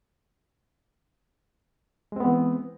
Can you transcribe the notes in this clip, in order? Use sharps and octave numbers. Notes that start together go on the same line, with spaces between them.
E3 G#3 B3 C4